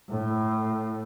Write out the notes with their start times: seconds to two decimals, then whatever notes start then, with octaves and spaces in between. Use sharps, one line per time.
0.10 A2